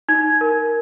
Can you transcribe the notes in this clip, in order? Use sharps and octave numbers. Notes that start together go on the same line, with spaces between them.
D#4 G#6
A#4